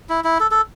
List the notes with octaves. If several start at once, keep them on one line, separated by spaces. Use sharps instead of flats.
E4
E4
A4
A4